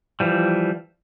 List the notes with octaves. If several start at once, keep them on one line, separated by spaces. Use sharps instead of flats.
E3 F3 G3